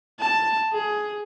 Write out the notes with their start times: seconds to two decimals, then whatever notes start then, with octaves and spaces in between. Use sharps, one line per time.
0.20 A5
0.72 G#4